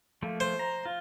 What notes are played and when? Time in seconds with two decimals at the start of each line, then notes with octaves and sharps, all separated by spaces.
0.22 F3 A3 A#3
0.40 C5
0.59 A#5
0.85 F4